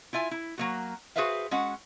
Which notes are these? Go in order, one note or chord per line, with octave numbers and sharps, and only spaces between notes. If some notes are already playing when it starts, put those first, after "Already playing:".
E4 F4 E5 G#5
E4
F#3 A#3 F#4
F#4 G#4 B4 C5 E5 F5
G#3 C#4 F#4 F#5